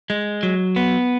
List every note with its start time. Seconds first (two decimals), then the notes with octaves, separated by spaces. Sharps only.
0.10 G#3
0.43 F#3
0.76 B3